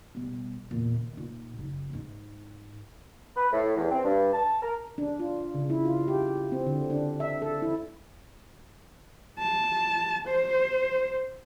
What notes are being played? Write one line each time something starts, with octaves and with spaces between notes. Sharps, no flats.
B2 G3
E2 A#2
D#3
A#2 D#4
F#1
G#2 D#4
B4
A2
E2
C4
G2
A5
A#4
D4
F4
C#3
E4
F4
G4
C4
D3
D4
E5
A4
E4
A5
C5